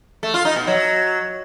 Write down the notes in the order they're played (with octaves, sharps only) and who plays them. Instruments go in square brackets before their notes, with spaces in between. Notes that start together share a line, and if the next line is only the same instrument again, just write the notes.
[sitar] A3
F4
D#4
B2
F#3